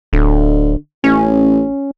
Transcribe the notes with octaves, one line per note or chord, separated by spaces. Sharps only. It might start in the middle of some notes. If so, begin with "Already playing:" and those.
D1 D3
A1 C#4